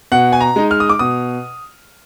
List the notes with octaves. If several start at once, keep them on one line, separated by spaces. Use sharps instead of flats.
B2 F#5
G#5
A#5
G#3 D#4
F6
D#6
D6
B2 D#6